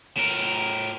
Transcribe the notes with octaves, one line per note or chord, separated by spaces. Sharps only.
A2 A#4